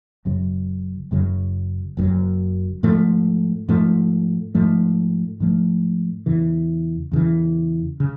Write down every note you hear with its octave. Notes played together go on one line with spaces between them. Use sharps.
F#1 F#2 C#3 F#3
F#1 F#2 C#3 F#3
F#1 F#2 C#3 F#3
G#2 F3 A3
G#2 F3 A3
G#2 F3 A3
G#2 F3 A3
E2 C#3 E3
E2 C#3 E3
C#3